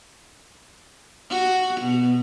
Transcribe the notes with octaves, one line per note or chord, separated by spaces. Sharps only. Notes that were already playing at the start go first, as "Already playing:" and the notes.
F#4
B2